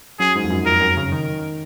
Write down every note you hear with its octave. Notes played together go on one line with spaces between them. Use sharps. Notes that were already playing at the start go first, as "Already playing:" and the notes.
F#2 G#4
G#2
F2
F#2
F2 A#4
F#2
C#3
D#3